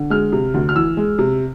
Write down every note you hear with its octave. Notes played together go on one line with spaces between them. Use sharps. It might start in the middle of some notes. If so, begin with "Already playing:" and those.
Already playing: D3
G#3 F6
C3
D2
F6
E3 E6
G#3
C3